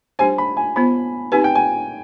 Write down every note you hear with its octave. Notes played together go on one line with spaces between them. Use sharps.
G3 D4 G4 C5 G#5
B5
G#5
B3 F4 C5 B5
C4 D#4 G4 B4 G#5
G5
G#5